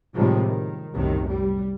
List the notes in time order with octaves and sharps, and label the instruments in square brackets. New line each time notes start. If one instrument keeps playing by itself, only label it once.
[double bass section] A2 C3 D#3 F3 G3 G#3
D#3
G1 C2 F#2 A2 C3 D#3
G3